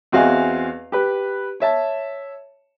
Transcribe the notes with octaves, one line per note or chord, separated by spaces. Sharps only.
E2 C4 F#4 D#5 F5 G#5
G4 B4
C#5 E5 A5